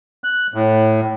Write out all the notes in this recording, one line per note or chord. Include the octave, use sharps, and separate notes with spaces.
F#6
A2